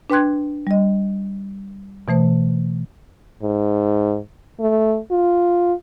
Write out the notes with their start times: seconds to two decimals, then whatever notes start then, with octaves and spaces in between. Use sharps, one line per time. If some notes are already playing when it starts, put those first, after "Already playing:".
0.10 D4 B4 G5 C6 F#6 G#6
0.67 G3 D#5
2.08 B2 E3 A3 C5
3.42 G#2
4.60 A3
5.11 F4